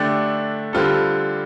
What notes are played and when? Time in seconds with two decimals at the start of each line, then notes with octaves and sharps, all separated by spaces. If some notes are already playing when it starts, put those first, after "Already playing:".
Already playing: D3 A3 D4 G4
0.73 D3 G3 C4 F4 A4